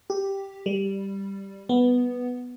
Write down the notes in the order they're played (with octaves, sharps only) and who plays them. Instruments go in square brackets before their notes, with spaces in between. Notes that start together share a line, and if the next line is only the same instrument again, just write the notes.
[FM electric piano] G4
G3
B3